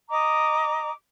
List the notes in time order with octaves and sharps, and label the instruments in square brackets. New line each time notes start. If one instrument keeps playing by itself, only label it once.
[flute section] D#5 A#5 D6